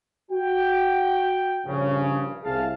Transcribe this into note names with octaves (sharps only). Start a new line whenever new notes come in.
F#4 G5
A#1 G2 C#3
C2 G#4 F5 A5